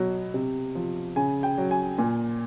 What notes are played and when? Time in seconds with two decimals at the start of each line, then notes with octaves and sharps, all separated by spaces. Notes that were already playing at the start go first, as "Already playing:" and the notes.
Already playing: B2 F#3
0.34 C3
0.75 F3
1.16 C#3 G#5
1.43 G5
1.58 F#3
1.71 G#5
1.98 A#2 G#5